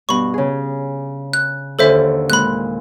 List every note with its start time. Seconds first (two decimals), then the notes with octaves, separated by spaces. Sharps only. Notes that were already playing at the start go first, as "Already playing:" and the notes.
0.09 G2 B2 B5 C#6
0.34 C#3 G#4
1.33 F#6
1.79 D#2 D3 A4 C5 E5 G#5
2.30 A#2 G#3 B5 F#6